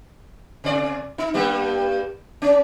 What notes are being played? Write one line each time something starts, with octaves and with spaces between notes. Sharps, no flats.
C3 D5
D#4
G2 G3 A#3
C#4